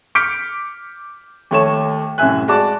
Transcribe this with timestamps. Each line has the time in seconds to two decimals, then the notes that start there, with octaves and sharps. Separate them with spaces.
0.15 D6 F6 G6 B6 C#7 D7
1.51 D#2 A3 C#5 E7
2.18 C2 F#2 A2 E5 G#5 F#6
2.48 G#3 F#4 D5 A5 D6